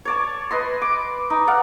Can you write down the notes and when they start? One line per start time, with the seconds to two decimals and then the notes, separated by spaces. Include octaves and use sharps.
0.05 C#5 D5 A5
0.51 B4 D#5 C6
0.81 D6
1.30 D#4
1.47 D5 F5 F#5